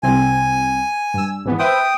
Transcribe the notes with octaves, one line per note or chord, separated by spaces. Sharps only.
C2 C3 C4 G#5
G2 E6
G#1 E3 B3
B4 C5 E5 G5 D#6